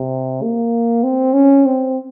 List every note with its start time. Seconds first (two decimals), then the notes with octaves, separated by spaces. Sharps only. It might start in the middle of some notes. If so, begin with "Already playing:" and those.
Already playing: C3
0.42 A#3
1.04 C4
1.34 C#4
1.66 C4